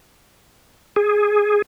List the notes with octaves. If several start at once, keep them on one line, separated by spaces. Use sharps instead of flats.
G#4